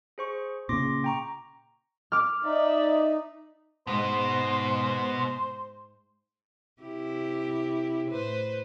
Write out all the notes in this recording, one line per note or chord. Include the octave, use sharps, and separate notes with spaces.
G#4 C5 C#6
A#2 C#3 C6 D6 A#6
G5 A#5 C#6
D6 F6
D#4 D5 E5
G#2 B2 G#3 B3 C5
C3 E4 G4
A2 B4 C5